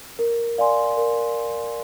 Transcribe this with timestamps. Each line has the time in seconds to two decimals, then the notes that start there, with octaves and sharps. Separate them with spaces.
0.19 A#4
0.58 D5 F5 G#5 C6
0.97 A#4